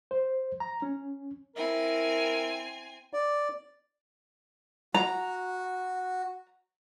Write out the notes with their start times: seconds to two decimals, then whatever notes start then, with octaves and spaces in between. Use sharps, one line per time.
0.11 C5
0.60 A#5
0.82 C#4
1.56 C4 E4 A#4 G#5
3.13 D5
4.94 F#4 A#5